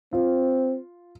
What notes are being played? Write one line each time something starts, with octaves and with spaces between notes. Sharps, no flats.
C4 F4